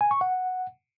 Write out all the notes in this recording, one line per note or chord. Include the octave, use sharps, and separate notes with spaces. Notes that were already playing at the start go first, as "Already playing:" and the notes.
G#5
C#6
F#5